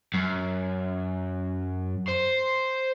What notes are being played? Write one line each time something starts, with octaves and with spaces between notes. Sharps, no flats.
F#2
C5